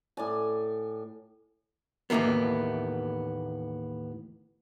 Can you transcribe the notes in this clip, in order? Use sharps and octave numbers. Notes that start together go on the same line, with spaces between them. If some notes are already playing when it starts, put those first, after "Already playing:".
A2 D5 G#5
D#2 A2 E3 A#3 B3